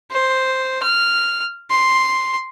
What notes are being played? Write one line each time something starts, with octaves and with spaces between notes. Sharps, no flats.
C5
F6
C6